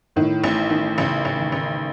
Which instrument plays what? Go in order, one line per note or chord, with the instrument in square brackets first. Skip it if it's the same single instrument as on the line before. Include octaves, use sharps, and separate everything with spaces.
[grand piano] A2 [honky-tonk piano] D#3
[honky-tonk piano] A1
D#3
[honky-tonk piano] A1 [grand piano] C#3
[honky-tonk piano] A1
[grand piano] D#3
[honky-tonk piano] A1